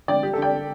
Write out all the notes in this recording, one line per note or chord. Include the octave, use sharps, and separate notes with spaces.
D3 D5 G5
G3 G4
A4
D3 D5 G5
D3